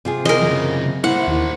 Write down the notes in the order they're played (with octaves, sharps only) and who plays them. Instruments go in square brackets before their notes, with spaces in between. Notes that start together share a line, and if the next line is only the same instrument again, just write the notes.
[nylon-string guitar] C3 F4 G#4
[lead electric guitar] E2 [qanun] A#4 D#5
[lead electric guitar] F#2 C#3
[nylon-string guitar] A#3 [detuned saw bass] E4 [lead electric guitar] A#4 C5 [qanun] F#5
[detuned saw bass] D#2